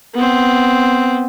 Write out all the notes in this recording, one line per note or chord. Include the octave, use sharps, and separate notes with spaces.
B3 C4